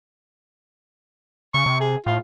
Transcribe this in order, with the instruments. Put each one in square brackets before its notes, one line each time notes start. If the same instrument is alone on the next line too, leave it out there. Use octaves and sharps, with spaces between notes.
[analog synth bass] C#3 [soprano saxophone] C#6
[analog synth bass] C3
[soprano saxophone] G#4
[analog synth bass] A2 [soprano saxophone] F4